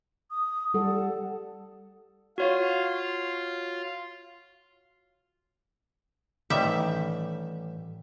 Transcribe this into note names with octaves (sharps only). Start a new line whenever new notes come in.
D#6
G3 A4 F#5
F4 F#4 C#5 F5
A1 D#3 G3 E5